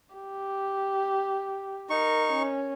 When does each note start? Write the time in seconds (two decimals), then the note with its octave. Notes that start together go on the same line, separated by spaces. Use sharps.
0.15 G4
1.90 D#4 A#4 C#6
2.33 C#4